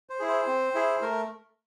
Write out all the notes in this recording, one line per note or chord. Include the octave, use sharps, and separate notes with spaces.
C5
E4 G#4
C5
C4
E4 G#4
A3 A#4